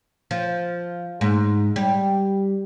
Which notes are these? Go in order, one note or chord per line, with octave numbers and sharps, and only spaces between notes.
F3
G#2
G3